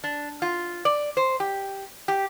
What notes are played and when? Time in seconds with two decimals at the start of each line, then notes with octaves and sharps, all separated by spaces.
0.04 D4
0.42 F4
0.85 D5
1.17 C5
1.40 G4
2.08 G4